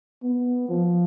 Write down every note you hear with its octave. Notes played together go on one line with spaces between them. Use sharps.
B3
F3